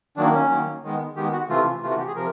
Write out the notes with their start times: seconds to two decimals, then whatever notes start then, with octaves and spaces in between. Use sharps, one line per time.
0.17 D#3 F#3 A#3 D4
0.34 C#4
0.50 D#3 F#3 A#3
0.84 D#3 G#3 B3
1.16 D#3 G#3 B3 G4
1.33 F#4
1.49 C3 E3 A3 F4
1.82 C3 E3 A3 F4
1.90 F#4
1.99 G4
2.07 G#4
2.16 C3 F3 A#4